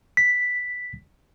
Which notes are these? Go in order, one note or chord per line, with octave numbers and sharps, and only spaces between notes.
B6